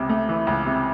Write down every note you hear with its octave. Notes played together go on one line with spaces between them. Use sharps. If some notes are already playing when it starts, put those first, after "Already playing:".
Already playing: C#2 C3
A3
E3
C#2
C3